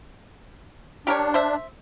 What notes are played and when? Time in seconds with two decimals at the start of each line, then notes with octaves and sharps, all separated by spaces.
1.07 D4 G4 A#4 C#5
1.34 C5 E5